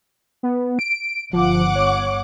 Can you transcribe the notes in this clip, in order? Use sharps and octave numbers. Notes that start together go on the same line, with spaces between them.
B3
D7
G1 F3 F#5 D6
C#5